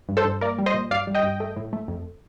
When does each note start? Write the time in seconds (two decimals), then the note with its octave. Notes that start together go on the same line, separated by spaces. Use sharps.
0.09 G2
0.17 A4 C5
0.25 G2
0.41 A#3 A#4 D5
0.59 G3
0.66 C5 D#5
0.74 A#2
0.91 G2 D5 F5
1.07 G3
1.15 D#5 G5
1.23 G2
1.40 A3
1.56 A2
1.73 A3
1.88 F2